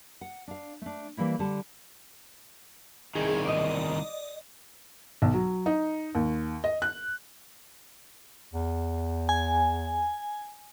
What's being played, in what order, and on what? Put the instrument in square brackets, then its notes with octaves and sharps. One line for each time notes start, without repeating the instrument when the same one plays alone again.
[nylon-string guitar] F#5
D4 F5
A3 D4
E3 G3 A#3 E4
D3 G3 F#5 A5
[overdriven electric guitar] C2 D#3 [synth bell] G#4
[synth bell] D5 D#5
[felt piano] B1
F#3
D#4
D#2
D#5
F#6
[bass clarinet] E2
[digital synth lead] G#5